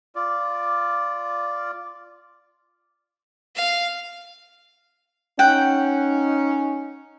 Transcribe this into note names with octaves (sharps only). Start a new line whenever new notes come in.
F4 D5
F5
C#4 D#4 F#5 G5